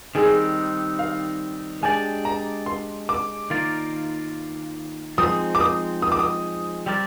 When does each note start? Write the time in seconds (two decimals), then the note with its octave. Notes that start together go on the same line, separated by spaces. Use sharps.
0.15 D#3 G3 C4 D#4 G#4
0.99 F5
1.83 G#3 D4 G4 D5 G#5
2.25 A#5
2.66 C6
3.09 D6
3.50 D#3 A#3 F4 A#4 D5
5.18 F3 G#3 C4 D#4 D#6
5.55 D6
5.61 D#6
6.02 D#6
6.12 D6
6.19 D#6
6.86 G3 C4 G4 A#4 D5